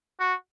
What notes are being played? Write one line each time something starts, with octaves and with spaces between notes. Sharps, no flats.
F#4